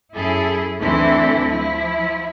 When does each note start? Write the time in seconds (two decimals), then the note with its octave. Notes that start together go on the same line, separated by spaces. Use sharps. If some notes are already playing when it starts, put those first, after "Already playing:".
0.14 F#2 E4 G#4 A4
0.81 D2 E3 C4 D4 E4 A4
1.49 F3 E4